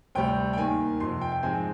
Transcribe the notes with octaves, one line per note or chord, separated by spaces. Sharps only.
D2 C3 G3 G5
G5
D#2 D#3 A#3 G#5
F2 C3 F3 C6
G5
G5
G#2 F3 G#3 C4 G#5